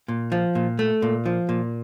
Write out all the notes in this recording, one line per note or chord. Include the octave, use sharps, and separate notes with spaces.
A#2
F3
A#2
A3
A#2
F3
A#2